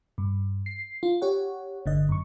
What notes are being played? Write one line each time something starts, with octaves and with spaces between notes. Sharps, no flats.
G2
C7
F4
G4 C#5 F#5
G1 D3 D#5
F#2 C#6